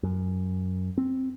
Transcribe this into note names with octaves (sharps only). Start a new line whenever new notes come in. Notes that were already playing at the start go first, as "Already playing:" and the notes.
F#2
C4